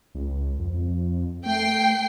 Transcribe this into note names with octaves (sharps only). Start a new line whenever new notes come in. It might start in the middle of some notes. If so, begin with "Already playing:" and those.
C#2
F2
A3 G5 C7